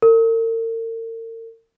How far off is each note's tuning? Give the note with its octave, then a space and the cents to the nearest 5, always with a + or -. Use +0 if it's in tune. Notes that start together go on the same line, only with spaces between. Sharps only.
A#4 -45